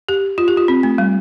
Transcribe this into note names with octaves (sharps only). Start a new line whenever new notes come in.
G4
F4
G4
F4
C4
A3
G3